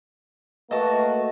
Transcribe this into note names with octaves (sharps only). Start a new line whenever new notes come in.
A3 A#3 F#4 B4 D#5 A5